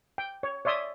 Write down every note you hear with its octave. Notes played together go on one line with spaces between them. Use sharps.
G5
C#5
C#5 D5 E5 C6 D#6